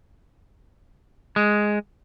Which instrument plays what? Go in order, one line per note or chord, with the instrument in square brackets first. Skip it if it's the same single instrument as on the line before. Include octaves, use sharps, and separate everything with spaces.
[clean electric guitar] G#3